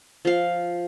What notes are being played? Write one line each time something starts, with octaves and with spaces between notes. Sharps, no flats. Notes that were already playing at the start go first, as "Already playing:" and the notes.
F3 F5